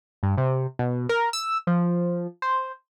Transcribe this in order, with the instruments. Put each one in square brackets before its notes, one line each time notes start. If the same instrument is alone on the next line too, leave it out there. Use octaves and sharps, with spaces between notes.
[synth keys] G2
C3
B2
A#4
E6
F3
C5